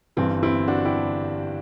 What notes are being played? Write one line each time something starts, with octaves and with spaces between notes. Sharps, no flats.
G1 G2 E3 G3 C4
C4 E4
D4 F#4
E4 G4